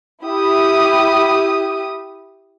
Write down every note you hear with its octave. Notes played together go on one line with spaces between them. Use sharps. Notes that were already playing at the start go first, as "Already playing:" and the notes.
E4 G4 D#6